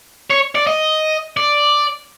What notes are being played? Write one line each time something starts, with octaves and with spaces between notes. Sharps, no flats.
C#5
D5
D#5
D5